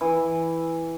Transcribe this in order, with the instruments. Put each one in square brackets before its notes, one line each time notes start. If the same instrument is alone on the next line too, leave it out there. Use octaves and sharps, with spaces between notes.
[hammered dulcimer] E3